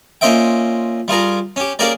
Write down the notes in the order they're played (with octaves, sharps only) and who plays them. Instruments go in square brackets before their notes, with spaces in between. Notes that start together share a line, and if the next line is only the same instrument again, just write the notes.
[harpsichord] A#2 C#4 C5 D#5 E5 G5
G3 F4 G#4 A#4
C#4 G4
A#3 C#4 G4 G#4 A#4 D5